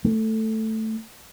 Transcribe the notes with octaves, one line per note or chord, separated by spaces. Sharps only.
A3